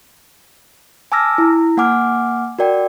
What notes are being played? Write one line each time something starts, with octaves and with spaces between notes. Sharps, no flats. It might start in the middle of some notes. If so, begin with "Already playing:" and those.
G#5 A5 D6 E6 F6 A#6
E4
A#3 F#5 G#5 D6 F6
F#4 A#4 D5 G5